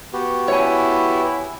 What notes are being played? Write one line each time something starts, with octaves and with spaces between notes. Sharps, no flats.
B3 F#4 G4
E4 C#5 G#5